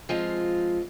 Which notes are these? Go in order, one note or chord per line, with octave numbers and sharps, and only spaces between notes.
F3 G#3 C4 F4